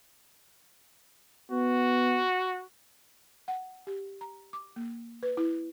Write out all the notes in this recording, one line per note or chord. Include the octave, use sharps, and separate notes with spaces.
B3 F#4
F#5
G4
A#5
D6
A#3
B4
E4